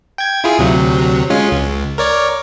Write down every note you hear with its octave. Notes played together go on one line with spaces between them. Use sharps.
G5 G#6
E4 F4 G#4
D2 C3 F#3
G#3 C#4 F4
C#2
A#4 C#5 D5